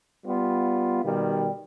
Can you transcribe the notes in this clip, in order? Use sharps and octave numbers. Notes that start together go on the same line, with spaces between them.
G3 B3 F4
B2 D#3 G3